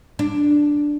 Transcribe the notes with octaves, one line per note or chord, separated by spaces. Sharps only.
D4